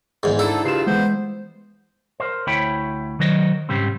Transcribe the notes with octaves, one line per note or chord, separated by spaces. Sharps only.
E2 G#2
D3 D#4 E4 A4
G2 C#3 F4 C7 E7
E3 G#3 B3 C5
A#4 C5
D2 E4 C#5 G5 B5
D#3 F#3 C5 D#5
G#2 C#3 G3 C4